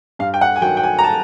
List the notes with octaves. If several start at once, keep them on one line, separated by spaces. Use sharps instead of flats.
G2 F5
G5
F#5
G#5
D#3 F#3 G5
G5
G#5
A#5
A5